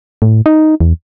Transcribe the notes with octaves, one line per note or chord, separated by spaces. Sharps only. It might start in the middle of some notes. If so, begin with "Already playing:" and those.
A2
D#4
E2